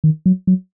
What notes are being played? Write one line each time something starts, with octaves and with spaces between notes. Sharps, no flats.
D#3
F#3
F#3